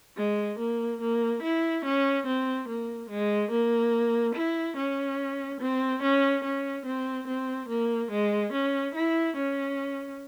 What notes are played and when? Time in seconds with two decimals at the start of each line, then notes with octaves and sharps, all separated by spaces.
0.17 G#3
0.59 A#3
1.01 A#3
1.43 E4
1.85 C#4
2.27 C4
2.68 A#3
3.10 G#3
3.51 A#3
4.35 E4
4.77 C#4
5.60 C4
6.02 C#4
6.44 C#4
6.86 C4
7.27 C4
7.69 A#3
8.11 G#3
8.53 C#4
8.95 E4
9.36 C#4